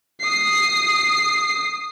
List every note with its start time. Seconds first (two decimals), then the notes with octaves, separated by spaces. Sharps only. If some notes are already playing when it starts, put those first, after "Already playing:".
0.21 D#6 C7